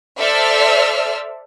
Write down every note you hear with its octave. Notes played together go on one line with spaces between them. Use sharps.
A4 C5 D5 E5 E6 F6